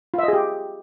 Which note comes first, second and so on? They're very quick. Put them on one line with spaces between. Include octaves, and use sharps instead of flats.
F4 E5 D#5 G#4 G4